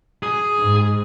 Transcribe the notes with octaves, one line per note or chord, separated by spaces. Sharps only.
G#4
G#2